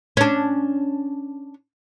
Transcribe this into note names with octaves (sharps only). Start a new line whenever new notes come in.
C#4 D4